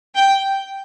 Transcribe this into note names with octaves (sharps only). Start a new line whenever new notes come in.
G5